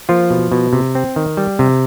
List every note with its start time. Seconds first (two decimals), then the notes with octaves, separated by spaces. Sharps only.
0.09 F3 A#3 F4
0.31 B2
0.52 B2
0.73 C3
0.95 C4
1.16 D#3
1.37 G3
1.59 C3